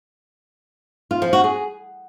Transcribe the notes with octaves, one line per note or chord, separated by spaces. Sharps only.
F4
F3
F#4
G#4